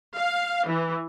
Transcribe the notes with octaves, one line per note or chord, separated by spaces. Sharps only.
F5
E3